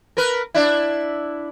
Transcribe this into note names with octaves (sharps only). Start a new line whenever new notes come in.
A#4 B4
D4 E4